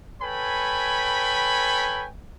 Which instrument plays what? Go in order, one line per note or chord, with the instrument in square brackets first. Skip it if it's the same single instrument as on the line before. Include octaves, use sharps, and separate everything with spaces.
[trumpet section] A4 B4 C#5 G5 G#5 B5